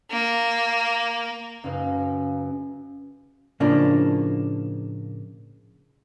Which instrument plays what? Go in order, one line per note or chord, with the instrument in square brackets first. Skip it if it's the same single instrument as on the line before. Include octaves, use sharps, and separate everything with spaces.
[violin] A#3
[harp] F#1 F#2 D#4 B4 F5
[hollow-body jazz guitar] A2 C#3 F3 A#3 D4